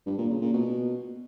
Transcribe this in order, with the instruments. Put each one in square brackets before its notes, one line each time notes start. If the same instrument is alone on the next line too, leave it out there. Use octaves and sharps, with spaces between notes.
[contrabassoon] G2
A#2
C#3
A#2
B2